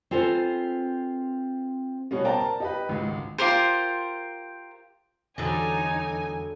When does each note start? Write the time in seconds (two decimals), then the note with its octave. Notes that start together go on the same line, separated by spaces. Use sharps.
0.11 C4 F4 G#4 A4 B4 C5
2.11 B2 G3 B3 C#4
2.24 A#4 C5 D5 G5 A5 A#5
2.40 A5
2.60 D#4 G4 B4
2.89 G#1 C#2
3.38 F4 G4 A#4 C5
5.38 E2 D3 F#3 G3 D#4 G#5